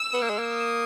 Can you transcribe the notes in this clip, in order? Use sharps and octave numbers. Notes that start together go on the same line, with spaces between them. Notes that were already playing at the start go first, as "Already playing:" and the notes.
Already playing: E6
B3
A#3
G#3
A#3
D#6